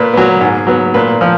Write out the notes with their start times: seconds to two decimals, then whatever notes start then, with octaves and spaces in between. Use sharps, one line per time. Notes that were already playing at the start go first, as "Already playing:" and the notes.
Already playing: A#2 B4
0.13 F#3 B3
0.41 G#2
0.67 F#3 B3
0.94 A#2 B4
1.21 F3